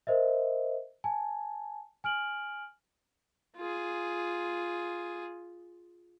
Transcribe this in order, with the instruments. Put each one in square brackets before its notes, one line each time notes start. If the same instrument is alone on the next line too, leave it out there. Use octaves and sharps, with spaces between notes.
[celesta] A#4 C5 D#5 E5
G#5 A5
G#5 F6 D7 F#7
[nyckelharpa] F4 G#4